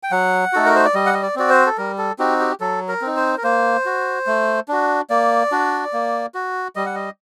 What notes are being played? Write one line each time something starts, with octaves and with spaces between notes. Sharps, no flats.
G5
F#3 F#5
A3 D#4 F#4 A4
A#4
C5
D5
G3 D#5
F#5
D#5
D5
C4 F#4 D5
C5
A4
G3 A#4
A4
C4 D#4 F#4 G4
G4
F#3 A4
A#4
C4 D#4
C5
A#4
A#3 C5
F#4
A3
D4 F#4
A#3 D5
D4 F#4
A#3
F#4
G3 D#5
F#5
D#5